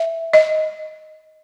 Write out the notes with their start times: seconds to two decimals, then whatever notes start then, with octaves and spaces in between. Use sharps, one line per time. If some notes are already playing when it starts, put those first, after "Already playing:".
Already playing: E5
0.33 D#5